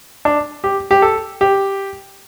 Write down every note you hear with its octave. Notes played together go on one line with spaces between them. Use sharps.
D4
G4
G4
A4
G4